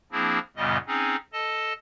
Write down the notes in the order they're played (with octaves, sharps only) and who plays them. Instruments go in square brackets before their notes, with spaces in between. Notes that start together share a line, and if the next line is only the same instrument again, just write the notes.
[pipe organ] F3 A#3 C4 D4 E4 G#4
F#2 A#2 C#3 G3 B3 D#5
C4 C#4 D#4 G#4
A4 D#5 A5